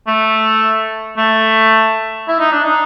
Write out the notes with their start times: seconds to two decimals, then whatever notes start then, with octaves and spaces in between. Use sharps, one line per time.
0.07 A3
1.17 A3
2.28 E4
2.39 D#4
2.52 D4
2.64 D#4